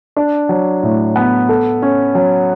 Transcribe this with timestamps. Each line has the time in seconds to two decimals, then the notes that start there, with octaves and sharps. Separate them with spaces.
0.17 D4
0.49 F#3
0.83 A2
1.16 B3
1.49 A4
1.82 C#4
2.15 F#3